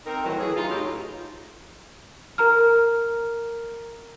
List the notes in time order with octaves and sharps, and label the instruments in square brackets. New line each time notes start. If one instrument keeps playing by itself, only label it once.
[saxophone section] C4 D#4 A#4
A2 D#3 E3 F#3
E3 G#4
D#4 F4
A2 F#3 C#4 D#4 G4
[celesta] A#4 A#5 F6